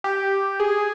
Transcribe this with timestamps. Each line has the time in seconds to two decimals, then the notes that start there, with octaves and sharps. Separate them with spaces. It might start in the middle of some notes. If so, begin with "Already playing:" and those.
0.04 G4
0.60 G#4